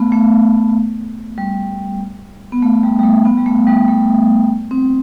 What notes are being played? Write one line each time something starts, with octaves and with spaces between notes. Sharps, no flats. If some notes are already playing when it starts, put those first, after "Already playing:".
Already playing: A3 B3
A3
G3
B3
A3
G3
G3
A3
B3
G3
A3
G3
A3
C4